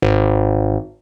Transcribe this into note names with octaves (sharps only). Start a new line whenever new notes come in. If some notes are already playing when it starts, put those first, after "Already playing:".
G#1